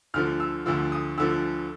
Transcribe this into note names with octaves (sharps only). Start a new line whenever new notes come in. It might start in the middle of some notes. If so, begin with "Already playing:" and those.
D2 D3 F3 F6
E6
D2 D3 F3 E6
D#6
D2 D3 F3 E6